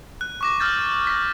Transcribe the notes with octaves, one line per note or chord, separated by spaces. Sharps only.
F#6
C#6 D6 A#6
E6 F6 G6 A6
A#6 B6